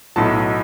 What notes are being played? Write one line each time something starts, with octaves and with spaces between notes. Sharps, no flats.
B1 A2 F#3 A5